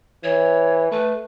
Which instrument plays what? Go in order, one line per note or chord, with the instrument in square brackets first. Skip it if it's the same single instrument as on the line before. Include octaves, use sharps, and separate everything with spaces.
[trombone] E3 [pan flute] C#5
[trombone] A3 [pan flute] B4